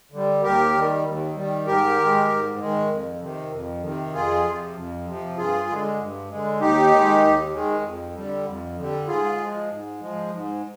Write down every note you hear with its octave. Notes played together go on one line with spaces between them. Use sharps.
D3 G3
D#2 G4 A#4
D#3 G3
D#2
D#3 G3
G#2 G4 A#4
D#3 G#3
G#2
D#3 G#3
F2
C3 D#3
F2
C3 D#3
F2 F4 G#4
C3 F3
F2
C3 F3
G2 F4 G#4
D3 G#3
G2
D3 G#3
D#2 D#4 G4
D#3 G#3
D#2
D#3 G#3
F2
D3 G3
F2
D3 G3
G#2 F4 G#4
F3 G#3
G#2
F3 G#3
G#2